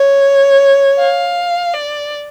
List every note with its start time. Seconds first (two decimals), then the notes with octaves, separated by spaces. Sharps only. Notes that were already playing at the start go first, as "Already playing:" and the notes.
Already playing: C#5
0.99 F5
1.74 D5